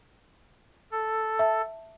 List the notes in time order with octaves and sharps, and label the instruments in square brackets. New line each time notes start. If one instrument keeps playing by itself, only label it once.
[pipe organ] A4
[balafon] E5 A5